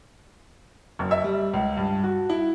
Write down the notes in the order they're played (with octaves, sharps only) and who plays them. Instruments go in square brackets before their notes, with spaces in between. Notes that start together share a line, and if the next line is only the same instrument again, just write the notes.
[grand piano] F#1
E5
G3
C#2
G2
F#4
E4